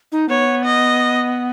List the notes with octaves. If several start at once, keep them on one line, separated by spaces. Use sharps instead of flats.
D#4
B3 C#5
D#5